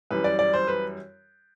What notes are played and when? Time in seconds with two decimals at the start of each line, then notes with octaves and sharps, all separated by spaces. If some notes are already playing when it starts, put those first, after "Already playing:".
0.11 F#2 E3 G3 B4
0.24 D5
0.39 D5
0.54 C5
0.67 B4